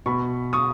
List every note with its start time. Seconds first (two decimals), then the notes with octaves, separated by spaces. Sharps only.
0.06 B2 B5 C#6
0.53 C#6 D#6